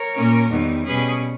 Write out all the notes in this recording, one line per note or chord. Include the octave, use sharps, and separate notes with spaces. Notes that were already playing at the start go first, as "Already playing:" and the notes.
Already playing: A#4 C#5
A#2 A#3 C#4
E2 D#3 G3 B3
B2 G3 C#4 G#4 B4